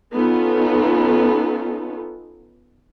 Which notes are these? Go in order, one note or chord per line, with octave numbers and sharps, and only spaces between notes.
B3 C#4 D#4 F4 A4